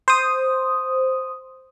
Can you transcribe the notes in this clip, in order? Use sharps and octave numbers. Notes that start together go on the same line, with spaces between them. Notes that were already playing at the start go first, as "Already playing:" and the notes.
C5 D#6